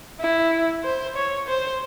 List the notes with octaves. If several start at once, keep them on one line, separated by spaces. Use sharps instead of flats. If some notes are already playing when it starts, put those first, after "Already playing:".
E4
C5
C#5
C5